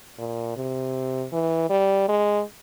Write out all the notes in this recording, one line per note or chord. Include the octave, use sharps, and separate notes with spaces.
A#2
C3
E3
G3
G#3